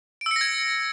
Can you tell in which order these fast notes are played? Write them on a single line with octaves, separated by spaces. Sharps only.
D7 E6 C#7 A#6 G#6